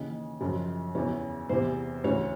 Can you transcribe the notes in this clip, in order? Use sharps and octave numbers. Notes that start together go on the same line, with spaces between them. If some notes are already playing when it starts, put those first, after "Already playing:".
Already playing: D#2 C#3 E3 D#5
F#2 C#3 F3
E2 C#3 E3 C#5
E2 C3 E3 C5
D2 C#3 E3 C#5